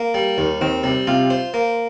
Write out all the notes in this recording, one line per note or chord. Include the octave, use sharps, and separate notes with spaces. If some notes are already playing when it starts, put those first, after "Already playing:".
Already playing: A#3
G3
D#2 D#3
D#3 C4
C3 G3
C3 F4
C5
A#3